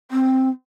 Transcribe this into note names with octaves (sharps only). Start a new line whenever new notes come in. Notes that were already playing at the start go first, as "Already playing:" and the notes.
C4